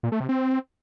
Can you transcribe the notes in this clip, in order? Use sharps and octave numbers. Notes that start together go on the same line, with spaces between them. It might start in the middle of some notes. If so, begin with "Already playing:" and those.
A#2
A3
C3
C4